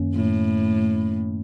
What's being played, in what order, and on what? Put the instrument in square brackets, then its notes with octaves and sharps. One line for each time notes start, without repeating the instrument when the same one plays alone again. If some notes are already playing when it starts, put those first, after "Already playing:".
Already playing: [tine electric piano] F#2 D#3 A#3 C#4
[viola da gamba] A2